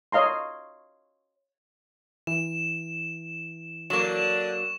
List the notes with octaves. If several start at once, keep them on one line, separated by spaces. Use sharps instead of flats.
C#5 D#5 F5 A#5 C6
E3 E7
D3 F#3 A#3 D4 C#6 E7